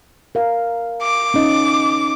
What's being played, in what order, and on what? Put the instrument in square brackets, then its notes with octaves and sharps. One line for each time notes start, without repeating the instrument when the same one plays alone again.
[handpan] A#4 F5
[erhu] D6
[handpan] C#4 D#4 D#5